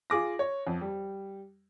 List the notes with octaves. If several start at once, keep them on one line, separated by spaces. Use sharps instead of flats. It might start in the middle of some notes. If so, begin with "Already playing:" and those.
F4 G#4 D6 A#6
C#5
F2
G3